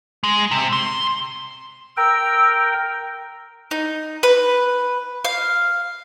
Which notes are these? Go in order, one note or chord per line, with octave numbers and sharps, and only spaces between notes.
G#3
C3
C6
A#4 G5 E6
D#4
B4
F5